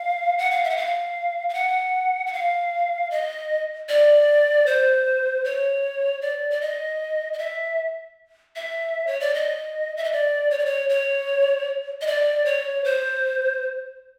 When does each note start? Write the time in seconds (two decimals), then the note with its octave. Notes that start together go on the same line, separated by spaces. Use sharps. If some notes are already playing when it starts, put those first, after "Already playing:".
Already playing: F5
0.38 F#5
0.51 F5
0.64 E5
0.70 F#5
0.77 F5
1.49 F5
1.54 F#5
2.26 F#5
2.33 F5
3.11 D#5
3.89 D5
4.66 C5
5.45 C#5
6.21 D5
6.51 D5
6.61 D#5
7.33 D#5
7.38 E5
8.56 E5
9.07 C#5
9.20 D5
9.34 D#5
9.97 E5
10.04 D#5
10.12 D5
10.51 C#5
10.59 D5
10.66 C#5
10.89 C#5
12.01 D#5
12.07 D5
12.45 C#5
12.84 C5